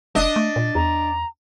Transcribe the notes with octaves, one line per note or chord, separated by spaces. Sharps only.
F1 D4 D#5
A3
A#2
E2 A#5